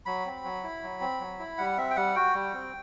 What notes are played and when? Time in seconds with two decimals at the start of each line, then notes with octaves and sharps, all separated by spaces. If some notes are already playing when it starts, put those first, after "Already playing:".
0.06 F#3 B5
0.26 C4
0.44 F#3
0.64 E4
0.83 F#3
1.01 C4
1.21 F#3
1.39 E4
1.58 G3 F#5
1.78 C4 E5
1.90 G5
1.96 G3 F#5
2.15 F#4 G5
2.34 G3
2.53 C4